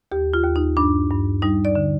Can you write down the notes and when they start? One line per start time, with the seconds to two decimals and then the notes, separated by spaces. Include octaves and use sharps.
0.12 D#2 G4
0.34 F4
0.44 D#2
0.56 D#4
0.77 G2 D4
1.10 G2
1.42 G3 D#4
1.65 D5
1.75 D3